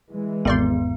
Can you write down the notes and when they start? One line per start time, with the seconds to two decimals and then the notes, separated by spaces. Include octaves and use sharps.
0.13 E3 G#3
0.45 G#1 E2 G#2 B3 D5 C6 G6